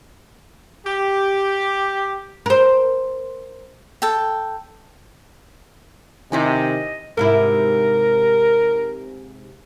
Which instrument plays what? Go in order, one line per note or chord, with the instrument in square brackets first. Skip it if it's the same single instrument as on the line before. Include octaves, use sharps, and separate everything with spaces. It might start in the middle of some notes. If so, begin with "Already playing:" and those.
[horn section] G4
[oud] A#4 C5
[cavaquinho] A4 G5
[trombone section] C3 [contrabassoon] D#3 [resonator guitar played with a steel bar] C4 E4 G#5 [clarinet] D#5
[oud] G#2 C3 E4 [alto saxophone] A#4